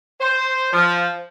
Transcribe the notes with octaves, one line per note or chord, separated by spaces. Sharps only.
C5
F3